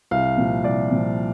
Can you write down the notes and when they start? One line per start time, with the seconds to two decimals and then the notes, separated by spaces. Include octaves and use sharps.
0.11 C2 F5
0.37 A#2 F3
0.64 C2 D5
0.91 A#2 F3